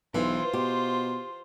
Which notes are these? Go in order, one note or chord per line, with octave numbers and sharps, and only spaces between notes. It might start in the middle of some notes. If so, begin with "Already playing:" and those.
B1 E3 F4 C5
B2 G4